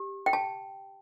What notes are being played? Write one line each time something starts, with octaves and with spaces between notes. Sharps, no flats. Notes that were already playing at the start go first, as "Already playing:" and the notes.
Already playing: G4
G5
A5